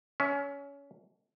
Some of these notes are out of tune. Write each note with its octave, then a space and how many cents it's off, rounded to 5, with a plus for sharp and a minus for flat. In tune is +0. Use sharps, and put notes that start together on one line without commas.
C#4 +25 E5 +0